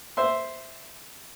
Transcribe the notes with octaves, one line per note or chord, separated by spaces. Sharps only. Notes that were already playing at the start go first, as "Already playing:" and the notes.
C5 E5 C6